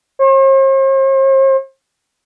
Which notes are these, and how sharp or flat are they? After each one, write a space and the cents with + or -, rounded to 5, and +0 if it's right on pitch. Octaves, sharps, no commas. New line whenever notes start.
C5 +45